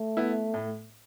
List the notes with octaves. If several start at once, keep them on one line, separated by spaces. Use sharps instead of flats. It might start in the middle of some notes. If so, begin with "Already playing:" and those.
Already playing: A3
B3 E4
A2